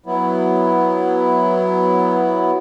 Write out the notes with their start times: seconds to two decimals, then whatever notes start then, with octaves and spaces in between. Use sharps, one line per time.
0.06 F#3 B3 E4